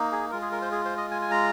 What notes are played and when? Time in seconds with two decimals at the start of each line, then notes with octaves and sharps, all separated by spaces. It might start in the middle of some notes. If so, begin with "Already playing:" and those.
Already playing: A#3 D#4
0.12 G#4
0.31 G#3 F4 A#4
0.42 G#4
0.52 A#4
0.62 C5
0.72 G#4
0.85 C5
0.97 D#5
1.11 G#5
1.22 G#5
1.31 A#5